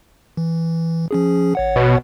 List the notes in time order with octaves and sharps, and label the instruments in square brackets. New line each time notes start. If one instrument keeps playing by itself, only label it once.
[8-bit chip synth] E3
F3 C#4 G#4
A1 C#5 F#5
[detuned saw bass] B2